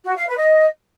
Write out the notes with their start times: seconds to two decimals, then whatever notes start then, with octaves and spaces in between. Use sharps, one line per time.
0.06 F#4
0.16 F5
0.27 B4
0.37 D#5